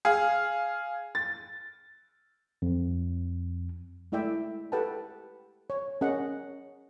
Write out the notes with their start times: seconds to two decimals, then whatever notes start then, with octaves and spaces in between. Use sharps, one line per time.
0.05 G#4 F5
1.15 A6
2.62 F2
4.12 G#3 A3 E4 D5 E5 G5
4.72 G4 A4 B4 F#5 G5 A5
5.70 C#5
6.01 C#4 G#4 A#4 D#5 F#5